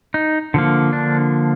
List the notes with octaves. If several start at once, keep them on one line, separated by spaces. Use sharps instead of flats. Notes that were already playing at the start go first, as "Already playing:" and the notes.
D#4
D3 F3 A#3
D4